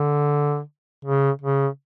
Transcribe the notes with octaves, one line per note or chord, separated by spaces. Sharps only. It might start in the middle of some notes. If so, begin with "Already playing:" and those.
Already playing: D3
C#3
C#3